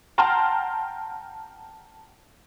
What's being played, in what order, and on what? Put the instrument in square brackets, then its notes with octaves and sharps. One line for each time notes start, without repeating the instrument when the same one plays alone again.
[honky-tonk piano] F#5 G5 A5 A#5 C6 F6